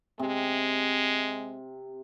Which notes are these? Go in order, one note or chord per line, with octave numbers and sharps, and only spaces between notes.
C3 G#3